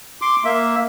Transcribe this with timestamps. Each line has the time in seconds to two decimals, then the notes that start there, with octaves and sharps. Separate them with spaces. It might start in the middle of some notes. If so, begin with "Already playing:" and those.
0.21 C6 D6
0.45 A#3 E5